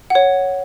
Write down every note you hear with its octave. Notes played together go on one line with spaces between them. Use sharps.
C#5 F#5